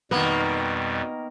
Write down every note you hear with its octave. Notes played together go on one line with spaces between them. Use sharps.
F2 B2 D#3 G3 A#3 B3